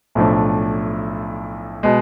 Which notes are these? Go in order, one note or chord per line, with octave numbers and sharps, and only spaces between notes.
B1 A2 F3 A3 D4
B2 G#3